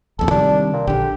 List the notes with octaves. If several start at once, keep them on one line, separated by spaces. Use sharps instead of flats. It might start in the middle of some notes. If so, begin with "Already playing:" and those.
D#1 A#1 F2 A4
C3 D#3 G3 D4
A#2
A#1 D3 G4